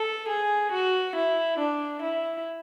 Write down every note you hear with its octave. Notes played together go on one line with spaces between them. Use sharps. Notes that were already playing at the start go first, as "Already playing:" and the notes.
Already playing: A4
G#4
F#4
E4
D4
E4